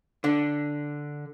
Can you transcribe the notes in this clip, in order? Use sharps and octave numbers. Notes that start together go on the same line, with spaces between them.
D3 D4